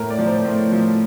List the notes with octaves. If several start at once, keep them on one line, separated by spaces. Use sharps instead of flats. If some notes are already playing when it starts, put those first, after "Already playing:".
Already playing: A2 A#4
D5
F3
C5
A2
F3